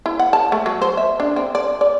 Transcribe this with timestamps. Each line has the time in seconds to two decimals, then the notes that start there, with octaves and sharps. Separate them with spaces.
0.06 E4
0.19 F#5
0.33 A5
0.52 A3
0.66 F#3
0.82 C5
0.97 E5
1.20 D4
1.36 C4
1.55 D5
1.81 D5